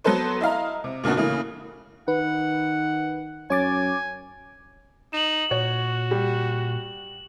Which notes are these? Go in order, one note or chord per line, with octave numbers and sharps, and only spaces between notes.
F#3 B3 A4 B4 C5
E4 D#5 F5 A#5
C3
A#2 C#3 B3 D4 F#4
A2 C#3 E3 A#3
D#3 B4 F#5
F#2 C#5 G#5 D6 A6
D#4 E7 F#7
A#2 F#4 C#5
G3